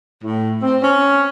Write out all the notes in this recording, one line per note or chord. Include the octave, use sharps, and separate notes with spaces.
A2
C4
C#4